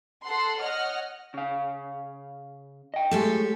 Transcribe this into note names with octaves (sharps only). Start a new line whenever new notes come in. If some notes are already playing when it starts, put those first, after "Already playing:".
A4 F#5 C6
C#5 D#5 F#5 F6
C#3 F5
D#5 G5
A2 G#3 A3 G4 A4